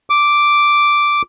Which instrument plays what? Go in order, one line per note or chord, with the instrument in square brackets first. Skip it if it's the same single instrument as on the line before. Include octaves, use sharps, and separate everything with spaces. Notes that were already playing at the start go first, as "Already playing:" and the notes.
[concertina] D6